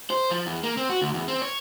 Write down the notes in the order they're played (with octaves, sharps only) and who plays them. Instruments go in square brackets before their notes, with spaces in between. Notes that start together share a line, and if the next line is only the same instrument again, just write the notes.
[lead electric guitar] C5
F3
E2
A#3
C4
F#4
D2
E2
C4
C#5